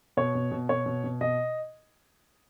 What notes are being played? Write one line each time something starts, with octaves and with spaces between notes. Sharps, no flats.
B2 C#5
B2
B2
B2 C#5
B2
B2
B2 D#5